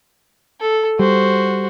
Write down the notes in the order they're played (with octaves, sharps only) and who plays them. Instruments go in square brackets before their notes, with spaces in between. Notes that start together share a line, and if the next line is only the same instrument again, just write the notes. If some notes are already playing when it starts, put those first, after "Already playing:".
[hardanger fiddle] A4
[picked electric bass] G3 [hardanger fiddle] F#4 C5